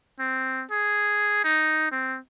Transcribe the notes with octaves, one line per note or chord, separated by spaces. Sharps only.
C4
G#4
D#4
C4